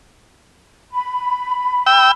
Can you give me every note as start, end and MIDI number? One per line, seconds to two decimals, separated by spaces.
0.92 2.13 83
1.87 2.11 79
1.87 2.11 88